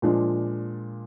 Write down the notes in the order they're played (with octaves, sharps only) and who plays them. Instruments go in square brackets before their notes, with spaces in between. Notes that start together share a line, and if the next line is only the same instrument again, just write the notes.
[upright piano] A#2 F3 G#3 D4